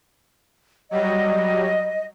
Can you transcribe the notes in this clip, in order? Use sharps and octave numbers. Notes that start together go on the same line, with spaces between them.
F#3 G3 D#5